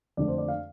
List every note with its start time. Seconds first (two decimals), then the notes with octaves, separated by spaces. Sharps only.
0.17 F2 D3 F3 A3 D5
0.28 C5
0.38 D5
0.48 F5